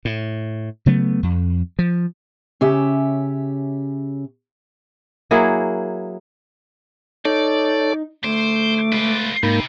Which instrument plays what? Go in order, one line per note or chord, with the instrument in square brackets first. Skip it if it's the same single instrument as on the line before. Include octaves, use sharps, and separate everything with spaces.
[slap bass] A2
C#3 F#3 A3 B3
F2
F3
[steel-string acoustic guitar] C#3 C#4 G4 E5
[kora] F#3 A#3 E4 G#4
[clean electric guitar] D#4 [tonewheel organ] A4 C#5 [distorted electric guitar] D5
[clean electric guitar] D2 [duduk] A3 [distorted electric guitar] C5 [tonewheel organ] D6
[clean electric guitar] B2 G#3 [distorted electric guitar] F4 B4
[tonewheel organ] G#2 A#3 [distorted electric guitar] C3 [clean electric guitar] D#4 B5